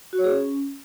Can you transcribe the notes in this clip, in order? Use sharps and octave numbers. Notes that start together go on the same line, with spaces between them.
F#4
C#5
G#4
C#4